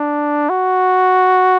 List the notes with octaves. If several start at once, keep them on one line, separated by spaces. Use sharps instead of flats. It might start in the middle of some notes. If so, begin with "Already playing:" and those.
Already playing: D4
F#4